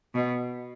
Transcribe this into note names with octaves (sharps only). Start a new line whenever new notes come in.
B2